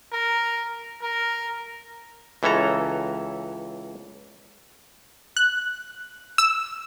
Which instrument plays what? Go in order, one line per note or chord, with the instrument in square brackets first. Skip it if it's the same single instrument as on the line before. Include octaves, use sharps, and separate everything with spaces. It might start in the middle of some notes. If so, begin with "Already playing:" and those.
[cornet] A#4
A#4
[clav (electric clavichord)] C#2 E3 C#4 A4 A#5
[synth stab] F#6
E6